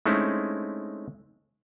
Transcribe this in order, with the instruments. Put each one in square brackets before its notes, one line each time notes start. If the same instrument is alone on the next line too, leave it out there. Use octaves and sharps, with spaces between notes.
[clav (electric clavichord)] G#3 A3 C4 C#4 D#4 E4